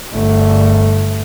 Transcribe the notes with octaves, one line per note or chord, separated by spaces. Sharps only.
G1 A3